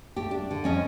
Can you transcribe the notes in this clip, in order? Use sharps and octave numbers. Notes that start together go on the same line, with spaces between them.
A3 G4
D4
D3
F2 C#4 D#5